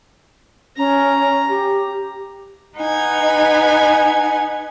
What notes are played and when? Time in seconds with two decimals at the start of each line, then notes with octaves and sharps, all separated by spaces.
0.77 C#4 A#5
1.49 G4
2.77 D#4 B4 F#5 G#5